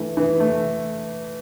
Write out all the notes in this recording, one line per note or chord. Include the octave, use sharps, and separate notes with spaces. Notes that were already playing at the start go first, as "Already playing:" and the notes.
Already playing: E3 A3
E3
A3